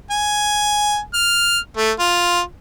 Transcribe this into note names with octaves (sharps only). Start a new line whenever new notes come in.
G#5
F6
A3
F4